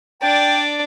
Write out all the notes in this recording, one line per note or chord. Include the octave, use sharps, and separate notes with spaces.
D4 D5 G5